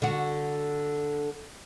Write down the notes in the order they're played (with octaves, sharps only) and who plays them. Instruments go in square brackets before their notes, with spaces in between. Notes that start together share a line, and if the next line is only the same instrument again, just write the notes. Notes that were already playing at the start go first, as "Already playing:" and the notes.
[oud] D3 F#4